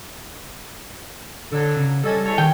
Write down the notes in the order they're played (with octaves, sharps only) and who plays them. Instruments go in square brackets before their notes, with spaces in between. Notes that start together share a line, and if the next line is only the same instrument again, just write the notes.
[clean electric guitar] D3 [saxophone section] F#3 D4 A4
[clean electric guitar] C#3
[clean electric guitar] G3 D#5 [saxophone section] C#4 A4
[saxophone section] E2 A4 C#5
[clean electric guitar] D#3 [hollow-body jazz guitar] G5